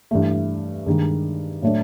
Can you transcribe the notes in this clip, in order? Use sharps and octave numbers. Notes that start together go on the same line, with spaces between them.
G2 E3 A3
G2 D#3 G#3
A2 F#3 A3 D4